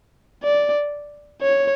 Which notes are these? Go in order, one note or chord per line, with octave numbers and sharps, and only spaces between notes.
D5
C#5